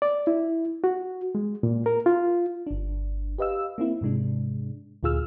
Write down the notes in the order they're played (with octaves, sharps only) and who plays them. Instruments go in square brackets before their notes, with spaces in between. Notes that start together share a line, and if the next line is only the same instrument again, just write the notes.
[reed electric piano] D5
E4
F#4
G#3
A#2
A#4
F4
[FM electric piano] G1 D4
G4 B4 D#5 F5 E6
A#3 C4 E4
G#2 C3 G#3 D4
D2 A#2 F4 G#4 E6 F6